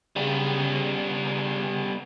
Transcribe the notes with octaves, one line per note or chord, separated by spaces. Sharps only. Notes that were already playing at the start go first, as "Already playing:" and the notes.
C#3 G3 B3